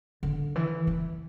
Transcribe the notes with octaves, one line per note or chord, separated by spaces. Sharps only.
D3
E3
E3